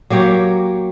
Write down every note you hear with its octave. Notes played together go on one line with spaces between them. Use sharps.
F#3 A#3 G4 C#5